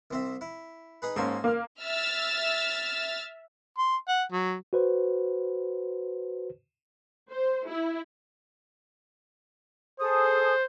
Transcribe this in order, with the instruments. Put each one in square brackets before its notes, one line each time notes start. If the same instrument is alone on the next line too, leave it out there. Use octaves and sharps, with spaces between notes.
[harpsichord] C2 C4 E5
E4
D#4 G#4 B4
[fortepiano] G#2 A#3 C#4 [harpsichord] A4 C5
[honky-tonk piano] A#3 [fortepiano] F5 F6
[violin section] E5 E6 F6 A6
[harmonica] C6
F#5
F#3
[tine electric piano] F#4 B4 C5
[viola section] C5
E4
[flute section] G#4 A4 D#6 [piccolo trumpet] C5